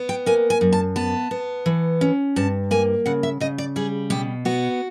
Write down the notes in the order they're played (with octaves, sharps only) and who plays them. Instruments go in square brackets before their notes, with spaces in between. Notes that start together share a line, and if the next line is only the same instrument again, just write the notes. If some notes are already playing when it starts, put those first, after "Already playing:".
Already playing: [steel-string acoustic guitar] B3
G5
A#3 G#5
G#5
F#2
A5
B3 A5
B3
E3
C#4
G2 A5
A#3 G#5
C#3 F#5
E5
C#3 D#5
D5
G3 G#4
B2 G4
B3 F#4